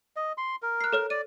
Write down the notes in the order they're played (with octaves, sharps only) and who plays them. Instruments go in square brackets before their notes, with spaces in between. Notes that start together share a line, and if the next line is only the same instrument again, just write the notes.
[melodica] D#5
C6
A#4
[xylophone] F#6 C7
A4 C#5 F6
[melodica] D5 [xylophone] D#7